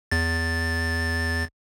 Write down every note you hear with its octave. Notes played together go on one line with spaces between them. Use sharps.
E2 A6